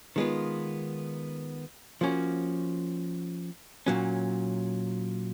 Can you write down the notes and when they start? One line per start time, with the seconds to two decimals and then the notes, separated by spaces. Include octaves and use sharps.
0.16 D#3 G#3 B3 F4
2.01 F3 A#3 C#4 F#4
3.86 A#2 F#3 C#4